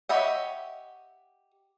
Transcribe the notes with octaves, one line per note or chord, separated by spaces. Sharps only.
G4 C#5 D#5 E5 F#5